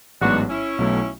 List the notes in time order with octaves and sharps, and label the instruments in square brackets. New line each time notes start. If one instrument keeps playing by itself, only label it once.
[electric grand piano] A1 G#2 F#3 B3 [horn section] D4 F#4
[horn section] C#4 E4
[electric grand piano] B1 B2 F#3 A3